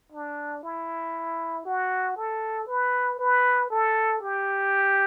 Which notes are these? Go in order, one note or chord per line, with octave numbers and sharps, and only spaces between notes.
D4
E4
F#4
A4
B4
B4
A4
G4